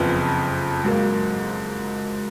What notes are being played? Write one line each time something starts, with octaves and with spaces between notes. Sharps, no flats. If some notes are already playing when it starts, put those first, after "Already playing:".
Already playing: F#1 F2 F3 B3
G#2 F#3 A#3